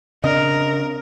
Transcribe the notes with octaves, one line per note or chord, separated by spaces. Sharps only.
C#3 C4 D4 A#4 D#5